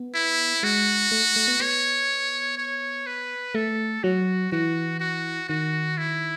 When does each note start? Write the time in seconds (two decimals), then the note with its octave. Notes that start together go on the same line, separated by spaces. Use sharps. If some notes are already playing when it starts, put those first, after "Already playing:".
Already playing: B3
0.14 E4
0.63 G#3 F#4
1.11 A3
1.36 A3
1.48 B3
1.60 B3 C#5
2.57 C#5
3.07 B4
3.54 A3 A4
4.03 F#3 F#4
4.52 E3 F#4
5.00 F#4
5.48 D#3 F#4
5.98 E4